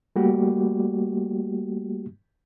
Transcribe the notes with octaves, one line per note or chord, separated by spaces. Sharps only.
G3 A3 A#3 F#4 G4